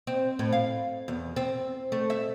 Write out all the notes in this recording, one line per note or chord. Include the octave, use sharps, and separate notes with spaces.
C4
A2
F5
E2
C4
A3
E5